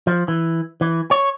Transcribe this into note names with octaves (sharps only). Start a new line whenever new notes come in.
F3
E3
E3
C#5